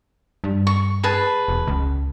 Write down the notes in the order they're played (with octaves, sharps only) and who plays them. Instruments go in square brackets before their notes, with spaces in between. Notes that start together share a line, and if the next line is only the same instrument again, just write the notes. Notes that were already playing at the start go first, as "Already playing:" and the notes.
[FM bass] G2
[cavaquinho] C#6
G#4 B4 A5
[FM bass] E1
C#2